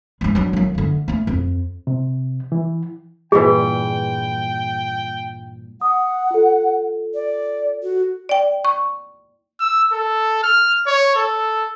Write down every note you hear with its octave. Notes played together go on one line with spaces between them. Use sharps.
E3 G#3
F#3 D4
D#3 F#3
D3 A3
A3 C#4
F2
C3
E3
G2 A#2 E3 G#4 B4 G5
F#5 D#6
F4 A4
D5
F#4
D5 G5
C#6
E6
A4
F6
C#5
A4